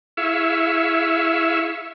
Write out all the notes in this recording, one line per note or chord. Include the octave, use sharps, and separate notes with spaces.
E4 G#4 E5 F5 C#6 E6